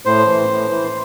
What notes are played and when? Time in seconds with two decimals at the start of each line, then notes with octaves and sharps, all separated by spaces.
0.05 A2 C5
0.27 E3
0.49 A2
0.70 E3